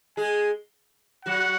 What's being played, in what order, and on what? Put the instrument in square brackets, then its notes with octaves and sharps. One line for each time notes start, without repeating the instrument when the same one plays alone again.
[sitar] G#3 G#4 [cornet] G#5
[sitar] F#3 F#4 [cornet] F#5